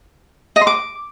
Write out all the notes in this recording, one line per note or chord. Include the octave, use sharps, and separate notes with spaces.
D#5
C6
D6